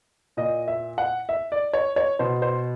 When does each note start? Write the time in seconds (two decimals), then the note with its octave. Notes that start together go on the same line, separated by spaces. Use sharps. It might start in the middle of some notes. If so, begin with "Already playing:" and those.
0.37 A#2 D#5
0.68 E5
0.98 F#5
1.29 E5
1.52 D5
1.73 C#5
1.96 C#5
2.19 B2 C5
2.42 C5